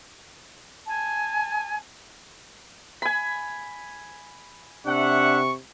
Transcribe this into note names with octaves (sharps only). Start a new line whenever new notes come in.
G#5 A5
G#5 B5
C3 D4 E5 F#5 C#6